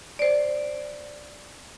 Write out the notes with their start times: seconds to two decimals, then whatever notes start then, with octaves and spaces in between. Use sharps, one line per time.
0.19 C5 D5